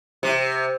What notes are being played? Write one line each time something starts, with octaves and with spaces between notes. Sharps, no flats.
C3